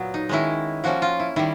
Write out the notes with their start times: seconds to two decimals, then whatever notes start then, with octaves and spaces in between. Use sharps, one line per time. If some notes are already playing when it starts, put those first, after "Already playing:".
Already playing: A#2 F#3 B3
0.14 D#4
0.29 D#3 G#3 C#4 E4
0.84 F3 A#3 C#4 F#4
1.02 F4
1.19 E4
1.36 D#3 G3 E4